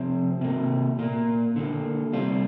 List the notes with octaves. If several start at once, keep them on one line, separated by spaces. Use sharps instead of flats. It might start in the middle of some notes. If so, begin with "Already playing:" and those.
Already playing: C3 F3 C4
C3 A#3
A#2 A#3
D3 A#3
C3 G3 C4 F4